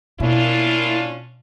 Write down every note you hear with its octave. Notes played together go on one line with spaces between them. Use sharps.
B2 A#3 C#4 D4 E4 F4